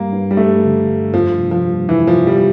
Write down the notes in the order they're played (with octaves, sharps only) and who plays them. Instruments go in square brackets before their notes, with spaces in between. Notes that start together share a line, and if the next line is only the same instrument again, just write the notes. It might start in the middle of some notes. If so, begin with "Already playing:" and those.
Already playing: [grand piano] G2 G3 [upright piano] A#3
[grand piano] G2
[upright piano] G3
[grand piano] G2 [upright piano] A3
[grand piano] D3
G2
[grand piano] F2 [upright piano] F3
[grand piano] F1
[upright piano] F3
[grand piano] G3
[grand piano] F1 [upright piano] E3
[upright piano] F3
[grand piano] F1
[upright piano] G3